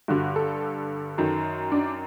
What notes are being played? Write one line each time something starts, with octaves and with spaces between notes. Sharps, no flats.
G2 D3 F#4
A4
F#2 D#3
D4